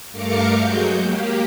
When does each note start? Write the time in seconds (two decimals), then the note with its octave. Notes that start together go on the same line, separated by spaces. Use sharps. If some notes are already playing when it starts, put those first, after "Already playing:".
0.11 G2 A3 A#4 F5 D6 C#7
0.57 F#3 G#3 F#4 G6
0.98 A#3 G4